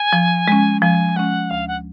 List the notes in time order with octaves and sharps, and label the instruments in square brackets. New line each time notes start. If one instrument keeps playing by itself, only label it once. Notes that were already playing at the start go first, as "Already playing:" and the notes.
Already playing: [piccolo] G#5
[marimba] F3
G#3 C#4
[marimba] F3 [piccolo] G#5
[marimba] G#3 C#4 [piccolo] F#5
[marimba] D2 [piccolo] F5
[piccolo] F#5